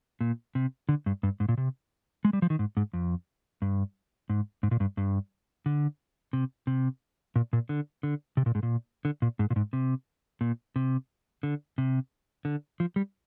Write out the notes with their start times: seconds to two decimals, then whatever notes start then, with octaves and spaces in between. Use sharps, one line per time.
0.21 A#2
0.55 C3
0.89 D3
1.06 G2
1.23 G2
1.40 G#2
1.49 A#2
1.57 C3
2.25 G#3
2.33 G3
2.42 F3
2.50 D#3
2.59 G#2
2.77 G#2
2.93 F2
3.62 G2
4.29 G#2
4.63 G#2
4.71 A#2
4.80 G2
4.97 G2
5.66 D3
6.33 C3
6.67 C3
7.36 A#2
7.53 A#2
7.69 D3
8.03 D3
8.37 C3
8.46 A#2
8.55 G#2
8.63 A#2
9.05 D3
9.22 A#2
9.39 G#2
9.50 A#2
9.56 G#2
9.73 C3
10.41 A#2
10.76 C3
11.43 D3
11.78 C3
12.45 D3
12.80 F3
12.96 G3